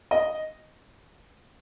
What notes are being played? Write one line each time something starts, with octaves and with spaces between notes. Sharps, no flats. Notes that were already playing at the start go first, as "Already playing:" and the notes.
D#5